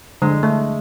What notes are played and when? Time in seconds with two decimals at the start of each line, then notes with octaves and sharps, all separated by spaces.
0.22 D3 G#3
0.43 A3